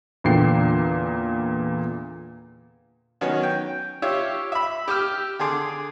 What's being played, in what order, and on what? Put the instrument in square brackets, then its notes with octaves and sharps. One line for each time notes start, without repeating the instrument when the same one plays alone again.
[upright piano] E2 A#2 D3 G5 C7
[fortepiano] D#3 F#3 B3 C#4
G5
F4 G4 C#5 E5
E5 B5
G4 G5 D6 E6 F6
D3 G#4 C6 D6